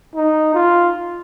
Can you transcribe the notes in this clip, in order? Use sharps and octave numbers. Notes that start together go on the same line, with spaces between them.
D#4
F4